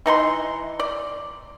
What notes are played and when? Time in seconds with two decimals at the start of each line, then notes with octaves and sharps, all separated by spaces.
0.06 E3 D#4 G#5 C6
0.80 D5